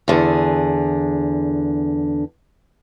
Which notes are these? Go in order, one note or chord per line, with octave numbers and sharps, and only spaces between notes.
E2 D3 G#4